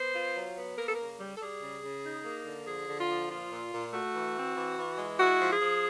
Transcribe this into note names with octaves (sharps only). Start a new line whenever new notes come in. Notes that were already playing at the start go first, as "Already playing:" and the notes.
Already playing: B3 C5
F4
F#3
B3
A#3 A#4
A4
C#3 A#4
G3
A4
G3 G#4
C#3
C#3
D#4
A#3
D3
F3 G#4
D3
F4
F3
A#2 F4
A#2
A#2
A3 F#4
E3
C4
E3
E3
G#3
E4 F#4
F3
G#4
F3